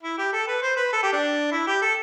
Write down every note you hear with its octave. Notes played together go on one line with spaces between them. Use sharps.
E4
G4
A4
B4
C5
B4
A4
G4
D4
E4
G4
A4